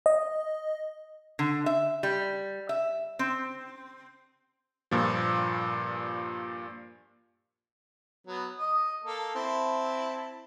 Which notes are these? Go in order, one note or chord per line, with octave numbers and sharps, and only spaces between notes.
D#5
D3
E5
G3
E5
C4
G2 A#2 F3
F#3 B3
D#5 D#6
A#3 A4
C4 E4 A5